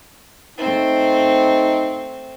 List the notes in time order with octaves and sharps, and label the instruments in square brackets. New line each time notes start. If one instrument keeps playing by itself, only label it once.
[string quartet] A3 C4 [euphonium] D#4